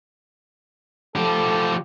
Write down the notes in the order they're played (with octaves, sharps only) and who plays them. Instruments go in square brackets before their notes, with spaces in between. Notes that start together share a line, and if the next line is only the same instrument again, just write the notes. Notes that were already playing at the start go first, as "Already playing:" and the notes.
[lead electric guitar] F3 G4 [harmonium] A4